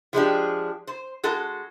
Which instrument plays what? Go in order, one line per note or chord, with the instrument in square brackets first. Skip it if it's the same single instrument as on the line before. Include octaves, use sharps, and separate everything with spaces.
[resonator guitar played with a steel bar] F3 G#3 D4 G4
C5
G#3 F#4 A4